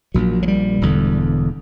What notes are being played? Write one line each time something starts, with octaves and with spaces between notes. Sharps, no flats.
A#1 A#2 F#3
F#3
G3
E1 E2 D3